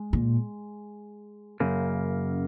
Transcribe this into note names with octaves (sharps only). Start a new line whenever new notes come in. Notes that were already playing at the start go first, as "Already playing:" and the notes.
Already playing: G#3
A#2
F#2 C#3 A#3